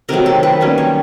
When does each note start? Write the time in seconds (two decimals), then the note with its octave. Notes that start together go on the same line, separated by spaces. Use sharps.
0.09 C3 D#3 F#3 A3 A#4
0.26 A4
0.43 B4
0.60 D#3 G3 A#3 C#4
0.78 C#5